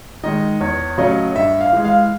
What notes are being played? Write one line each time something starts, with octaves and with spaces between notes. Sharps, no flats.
D#3 G#3 D#5
E2 C#5
C#3 F#3 A3 D#5
G2 E5
F5
E3 G#3
F5